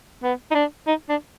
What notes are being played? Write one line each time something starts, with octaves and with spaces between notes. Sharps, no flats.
B3
D#4
D4
D#4
D4